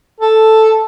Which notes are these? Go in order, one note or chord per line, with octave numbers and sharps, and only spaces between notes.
A4